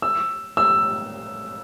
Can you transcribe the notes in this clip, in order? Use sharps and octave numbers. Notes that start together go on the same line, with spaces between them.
E6
E6